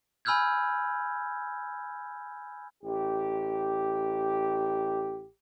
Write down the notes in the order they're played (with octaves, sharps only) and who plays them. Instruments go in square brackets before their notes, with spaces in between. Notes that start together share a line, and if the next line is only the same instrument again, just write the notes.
[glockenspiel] G#5 B5 E6 F6 G6 G#6
[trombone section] A1 G4